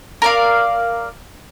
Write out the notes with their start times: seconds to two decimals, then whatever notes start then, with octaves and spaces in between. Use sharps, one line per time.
0.22 A#4 D5 F5